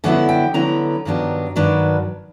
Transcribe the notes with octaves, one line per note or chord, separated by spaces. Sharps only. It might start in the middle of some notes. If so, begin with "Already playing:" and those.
D3 F#3 B3 E4 F#5
G5
D3 F#3 B3 E4 A#5
G2 D#3 F#3 B3 D4
G2 D#3 F#3 B3 D4